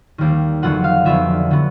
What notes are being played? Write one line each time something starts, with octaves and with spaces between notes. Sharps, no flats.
D#2 D#3 G3 A#3
F1 F2 D3 F#3 B3 F#5
F5
F1 F2 D3 F#3 B3 E5
D3 F#3 B3